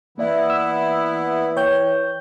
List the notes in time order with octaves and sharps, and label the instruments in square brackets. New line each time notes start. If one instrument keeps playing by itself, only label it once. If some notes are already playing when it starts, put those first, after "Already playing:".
[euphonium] E3 [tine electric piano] A#3 D5 E5 [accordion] B3 E4
[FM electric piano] E6
C#5 G5 G6